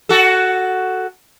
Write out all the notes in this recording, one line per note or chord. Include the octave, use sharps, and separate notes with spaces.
F#4 A4